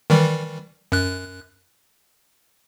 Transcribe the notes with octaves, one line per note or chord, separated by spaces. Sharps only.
D#3 E3 G3
F#2 F#6